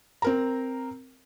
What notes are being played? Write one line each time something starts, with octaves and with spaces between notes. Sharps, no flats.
C4 A#4 A#5